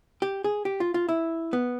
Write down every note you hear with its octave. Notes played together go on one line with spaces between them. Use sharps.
G4
G#4
G4
F4
F4
E4
B3